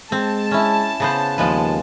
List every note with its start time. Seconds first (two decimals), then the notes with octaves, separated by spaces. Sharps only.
0.12 G#3 C4 A5
0.51 C#4 E4
1.00 C#3 B3 C5
1.38 D#2 F3 G#3 B4